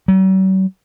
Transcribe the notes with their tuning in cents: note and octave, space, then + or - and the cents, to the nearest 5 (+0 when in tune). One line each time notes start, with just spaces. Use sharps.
F#3 +45